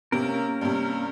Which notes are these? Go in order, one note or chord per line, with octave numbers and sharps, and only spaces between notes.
C3 A#3 C#4 A#4
G2 C3